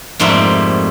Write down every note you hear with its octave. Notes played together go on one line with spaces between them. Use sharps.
F2 G#2 G3 A3 A#3 C4